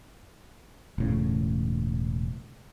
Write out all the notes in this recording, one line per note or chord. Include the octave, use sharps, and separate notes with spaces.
E1 A2 C#3